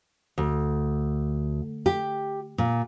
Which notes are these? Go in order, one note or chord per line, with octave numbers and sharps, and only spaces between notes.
D2
G4
A#2